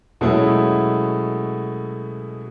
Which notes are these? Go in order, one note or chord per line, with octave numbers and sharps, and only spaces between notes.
B2 F#3 G#3 A3 C#4 E4